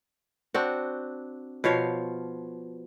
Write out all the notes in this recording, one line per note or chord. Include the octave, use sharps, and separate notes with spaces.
C4 D4 F#4
B2 F3 C#5 F5